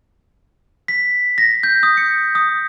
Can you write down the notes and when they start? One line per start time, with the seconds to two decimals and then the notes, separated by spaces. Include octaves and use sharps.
0.88 B6
1.38 A#6
1.63 G6
1.83 D#6
1.97 C#7
2.35 D#6